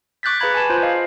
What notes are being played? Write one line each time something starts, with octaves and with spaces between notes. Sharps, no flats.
C#6 D6 F#6 G6 A6 B6
G#4 B4 F5 A#5 B5 G#6
G#5 A5
F4 C5
D#5 F5